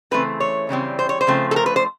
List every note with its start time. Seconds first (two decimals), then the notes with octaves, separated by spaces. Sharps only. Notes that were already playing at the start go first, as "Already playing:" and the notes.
0.11 C#3 E3 A3 C4 B4
0.40 C#5
0.69 C#3 E3 G3 C4
0.99 C5
1.09 C#5
1.21 C5
1.27 C#3 F3 A3 C4
1.51 A4
1.56 A#4
1.66 B4
1.76 C5